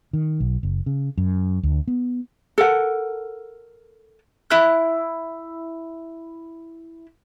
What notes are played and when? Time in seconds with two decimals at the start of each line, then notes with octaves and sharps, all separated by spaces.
0.13 D#3
0.40 B1
0.63 F#1
0.86 C#3
1.18 F#2
1.63 D2
1.88 B3
2.58 A4 A#4 F#5
4.50 E4 F#6